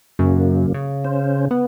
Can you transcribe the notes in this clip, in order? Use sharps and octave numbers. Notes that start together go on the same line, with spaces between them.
F#2 C#3 F#3 A#3
C#3
C#4 C5
B3